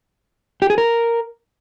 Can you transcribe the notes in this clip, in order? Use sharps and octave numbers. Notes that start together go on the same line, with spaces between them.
G4
G#4
A#4